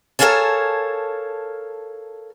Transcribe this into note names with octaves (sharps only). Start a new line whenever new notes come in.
A4 A#4 C#5 F5 G#5 A5